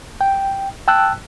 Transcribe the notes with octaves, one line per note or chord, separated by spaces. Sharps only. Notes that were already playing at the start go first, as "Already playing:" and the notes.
G5
G5 A5 E6 F#6